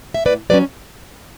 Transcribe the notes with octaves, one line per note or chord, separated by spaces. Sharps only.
E5
A2 B4 D5
F#3 C#4 B4 D5